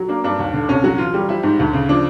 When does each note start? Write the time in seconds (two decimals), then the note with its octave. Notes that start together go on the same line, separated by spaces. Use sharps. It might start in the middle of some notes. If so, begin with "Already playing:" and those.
Already playing: F#3
0.08 A#3 D4
0.24 G2 D4
0.39 D#2
0.53 D3
0.69 C2 C#4
0.84 F#3 F#4
0.98 E3 F4
1.14 G3
1.29 F3 E4
1.43 G#2
1.59 D2
1.73 C#3
1.89 F3 D4